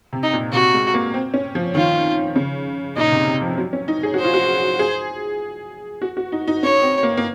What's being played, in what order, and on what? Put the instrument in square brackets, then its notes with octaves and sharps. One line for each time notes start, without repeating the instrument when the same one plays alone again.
[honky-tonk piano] C3
[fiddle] D#4
[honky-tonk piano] A#2
[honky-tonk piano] C3 [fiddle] F#4
[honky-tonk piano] G#3
A#3
C4
C#4
F3
[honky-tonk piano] D#3 [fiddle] F4
[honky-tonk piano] C#3
[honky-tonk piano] A#2 [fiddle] D#4
[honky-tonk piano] C3
C3
F3
F#3
C#4
D#4
G#4
F#4
[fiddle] C5
[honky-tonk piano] F4
F#4
G#4
F#4
F#4
D#4
D#4
[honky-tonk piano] C#4 [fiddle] C#5
[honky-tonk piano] C4
A#3
A#3